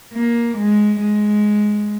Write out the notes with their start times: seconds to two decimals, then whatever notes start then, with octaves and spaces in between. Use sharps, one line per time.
0.13 A#3
0.57 G#3
1.01 G#3